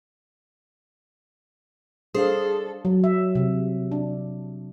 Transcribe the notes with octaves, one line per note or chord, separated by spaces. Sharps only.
G3 D4 G#4 A4 C5 F5
F#3
E5
C3
D4